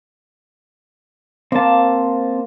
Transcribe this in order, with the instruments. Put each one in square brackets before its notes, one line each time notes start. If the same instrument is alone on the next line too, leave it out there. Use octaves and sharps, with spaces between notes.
[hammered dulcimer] A#3 [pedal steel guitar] C4 A5